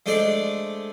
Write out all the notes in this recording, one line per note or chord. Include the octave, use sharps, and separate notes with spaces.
G#3 A3 D4 C5 D5